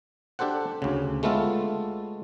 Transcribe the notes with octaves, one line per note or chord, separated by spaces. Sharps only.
D4 G4 A4 C5 F#5
D2 C#3
G#3 A3 B3 F4 A4